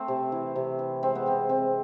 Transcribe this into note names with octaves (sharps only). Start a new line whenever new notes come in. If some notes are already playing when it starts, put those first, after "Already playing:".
Already playing: A3 C4
C3
E3
C3
E3
G#3 C4
B3
C3 C4
G#3 C4